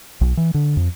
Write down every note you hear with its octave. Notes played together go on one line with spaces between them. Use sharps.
B1
E3
D3
F2